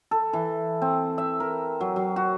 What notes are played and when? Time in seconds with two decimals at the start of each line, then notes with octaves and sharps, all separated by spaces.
0.11 A4
0.33 E3
0.82 C4
1.18 E5
1.40 A#4
1.81 F#3
1.96 F#3
2.16 F#4